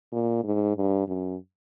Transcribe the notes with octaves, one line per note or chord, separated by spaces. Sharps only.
A#2
G#2
G2
F#2